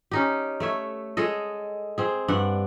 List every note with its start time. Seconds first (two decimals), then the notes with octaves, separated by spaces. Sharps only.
0.11 C#4 D#4 G4
0.60 A3 C#5 E5
1.17 G#3 G#4 A4 D#5
1.98 C4 G#4
2.28 G2 D4 F#5